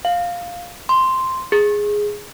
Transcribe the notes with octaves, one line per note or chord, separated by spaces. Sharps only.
F5
C6
G#4